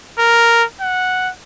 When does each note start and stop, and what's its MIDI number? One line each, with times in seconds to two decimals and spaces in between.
0.19 0.65 70
0.81 1.31 78